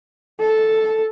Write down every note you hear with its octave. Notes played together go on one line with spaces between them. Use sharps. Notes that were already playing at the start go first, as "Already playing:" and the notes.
A4